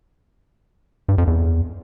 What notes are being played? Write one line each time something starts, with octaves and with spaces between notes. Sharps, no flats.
G2
F2
E2